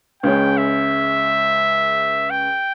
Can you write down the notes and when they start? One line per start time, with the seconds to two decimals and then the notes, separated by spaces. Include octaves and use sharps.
0.23 C#2 C#3 G#3 C#4 G5
0.57 E5
2.30 G5